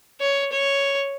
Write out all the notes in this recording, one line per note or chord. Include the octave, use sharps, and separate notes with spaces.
C#5
C#5